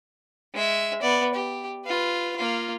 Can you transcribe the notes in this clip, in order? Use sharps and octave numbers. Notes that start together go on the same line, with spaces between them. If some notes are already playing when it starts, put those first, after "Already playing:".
G#3 E5
B3 D5
G4
F4 B4
A#3 F4